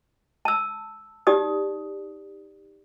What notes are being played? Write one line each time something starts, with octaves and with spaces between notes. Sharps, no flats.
A5 E6
D#4 G4 D5 D#6